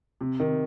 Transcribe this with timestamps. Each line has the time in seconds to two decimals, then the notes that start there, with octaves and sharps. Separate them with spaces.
0.21 C3
0.40 D#3